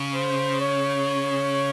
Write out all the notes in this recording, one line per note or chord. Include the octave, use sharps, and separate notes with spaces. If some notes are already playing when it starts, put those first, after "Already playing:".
Already playing: C#3
C5
C#5